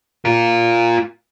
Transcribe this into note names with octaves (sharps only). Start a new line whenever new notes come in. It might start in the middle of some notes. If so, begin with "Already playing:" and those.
F4 A#4